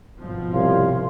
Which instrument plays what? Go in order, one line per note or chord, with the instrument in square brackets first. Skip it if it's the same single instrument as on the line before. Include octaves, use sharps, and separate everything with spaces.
[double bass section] G#1 B2 F3
[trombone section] C2 [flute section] C#5 F5 C6